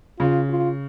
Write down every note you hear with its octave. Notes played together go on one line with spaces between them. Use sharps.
C#3 F4
F4